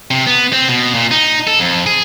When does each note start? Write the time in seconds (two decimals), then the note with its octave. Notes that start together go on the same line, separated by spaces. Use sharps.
0.11 C3
0.27 B3
0.53 C4
0.68 B2
0.94 A#2
1.11 D#4
1.47 A4
1.59 F2
1.86 G#4